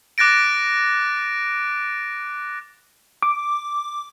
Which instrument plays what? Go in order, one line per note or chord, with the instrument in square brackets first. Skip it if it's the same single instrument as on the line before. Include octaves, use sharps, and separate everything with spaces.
[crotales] D6 F#6 A6 A#6 D7
[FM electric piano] D6